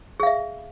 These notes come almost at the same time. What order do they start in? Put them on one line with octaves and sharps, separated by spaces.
G#4 F5 E5